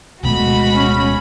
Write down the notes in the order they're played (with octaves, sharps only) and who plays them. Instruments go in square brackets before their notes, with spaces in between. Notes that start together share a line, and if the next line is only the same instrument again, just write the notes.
[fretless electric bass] D1 B2 A3 [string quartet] G#3 F#4 [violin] B5
[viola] C#4